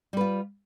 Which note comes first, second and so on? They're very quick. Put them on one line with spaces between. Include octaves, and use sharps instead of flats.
G3 B4 F4